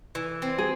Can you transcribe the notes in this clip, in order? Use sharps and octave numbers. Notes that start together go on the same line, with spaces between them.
E3
C4
G#4